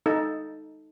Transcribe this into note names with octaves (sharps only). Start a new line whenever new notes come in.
D#4 A4